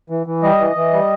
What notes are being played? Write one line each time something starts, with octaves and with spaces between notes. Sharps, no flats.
E3
E3
G3 D#5
E3
E3
G3